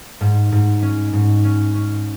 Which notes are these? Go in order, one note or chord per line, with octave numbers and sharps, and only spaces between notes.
G#2
G#2
C#4
G#2
C#4
C#4